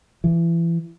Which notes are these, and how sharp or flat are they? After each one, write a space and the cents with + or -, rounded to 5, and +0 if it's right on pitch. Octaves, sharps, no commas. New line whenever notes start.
E3 +30